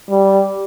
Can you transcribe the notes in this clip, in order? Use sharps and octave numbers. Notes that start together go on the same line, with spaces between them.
G3